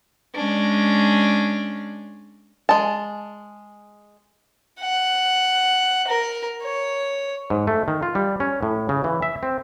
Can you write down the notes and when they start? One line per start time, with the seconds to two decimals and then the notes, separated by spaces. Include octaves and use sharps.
0.34 G#3 C#4 D4
2.69 G#3 A5
4.80 F#5
6.08 A#4
6.62 C#5
7.50 G#2
7.67 A3
7.88 D#3
8.03 F4
8.15 G3
8.40 C#4
8.63 A2
8.89 C#3
9.04 E3
9.22 E5
9.43 C4